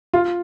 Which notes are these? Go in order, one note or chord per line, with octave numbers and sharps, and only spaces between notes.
F4